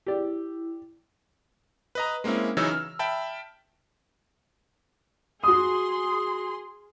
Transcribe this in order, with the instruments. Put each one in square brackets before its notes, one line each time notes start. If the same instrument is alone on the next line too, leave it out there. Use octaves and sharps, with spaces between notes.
[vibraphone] E4 [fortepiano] G4 D5
[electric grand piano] B4 D#5 A#5
G#3 A#3 C4 C#4 E4
C#3 E3 F#3 D#4 C#5 E6
F6
E5 G5 A5 B5
[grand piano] F#4 D#6 [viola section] G#4 C6